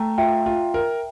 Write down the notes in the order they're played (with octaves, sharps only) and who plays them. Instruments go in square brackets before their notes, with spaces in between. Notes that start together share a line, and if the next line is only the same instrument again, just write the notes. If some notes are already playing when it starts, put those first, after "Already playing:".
Already playing: [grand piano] A3 [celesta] G5 A#5
[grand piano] F4 [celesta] E5 G5
[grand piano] F4
A#4